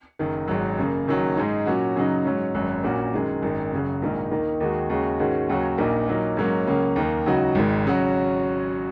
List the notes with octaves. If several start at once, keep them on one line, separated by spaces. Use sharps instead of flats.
F#1 F#2 D#3
G#1 G#2 F#3
F#2 C#3 A#3
F#1 F#2 D#3 F#3
G#2 G#3 D#4
A#2 F#3 C#4 F#4
F#2 C#3 F#3 D#4
G#2 F#3 C#4
G#1 F#2 F#3
A#1 A#2 A#3 C#4 F#4
F#2 D#3 G#3
G#1 F#2 D#3
F#1 F#2 C#3 F#3
A#1 G#2 D#3 A#3 D#4
D#2 D#3 A#3 D#4
D#2 D#3 G#3 F#4
D#2 C#3 G#3 C#4 F#4
G#2 D#3 G#3 C#4 F#4
D#2 C#3 F#3 C#4 F#4
A#1 A#2 A#3 D#4
A#2 F#3 A#3 D#4
G#2 F#3 A#3 C#4
C#2 C#3 F#3 A#3 C#4
D#2 D#3 A#3
C#2 C#3 F#3 D#4 F#4
G#1 G#2 D#3
C#3 F#3 C#4 F#4